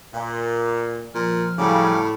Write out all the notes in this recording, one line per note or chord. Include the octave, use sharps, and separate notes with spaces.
A#2
A#2 F3 F6
A2 C#3 F#3 G3 D6